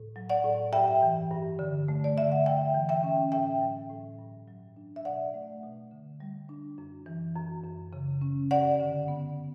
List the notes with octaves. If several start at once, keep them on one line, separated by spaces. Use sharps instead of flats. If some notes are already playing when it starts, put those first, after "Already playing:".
Already playing: A2
F#3
D5 F#5
A2
G2 E5 G5
E3
G2
D3
A3
D5
D3 E5
F#5
G2 E5 G5
E3
E5 G5
C#4
A2 E5 G5
F#3
A2
G2
F#3
D4
E5
B2 D5 F#5
A3
B2
D3
G3
D4
F#2
E3
F#2
F#2
C#3
C#4
G2 D5 F#5
D3
B3